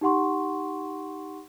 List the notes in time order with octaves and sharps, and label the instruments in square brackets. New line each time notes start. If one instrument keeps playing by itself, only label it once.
[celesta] D#4 G4 F#5 C6 C#6